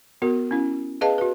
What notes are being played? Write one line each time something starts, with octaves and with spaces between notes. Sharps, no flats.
B3 F#4 A#4
C#4 E4
G#4 B4 D#5 F5 A5
F#4 B4